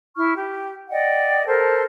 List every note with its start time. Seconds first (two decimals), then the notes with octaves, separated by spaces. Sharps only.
0.17 E4 C#6 F6
0.35 G4
0.90 D5 D#5 F#5 G5
1.47 A4 A#4 C5 A5